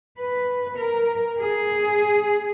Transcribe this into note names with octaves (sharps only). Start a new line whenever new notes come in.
B4
A#4
G#4